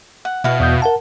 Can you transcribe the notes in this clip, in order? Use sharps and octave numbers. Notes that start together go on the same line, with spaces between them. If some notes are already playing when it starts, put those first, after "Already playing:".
F#5
B2 E4 F#4 F5
E2 D#6 G6
A#4 F#5 A5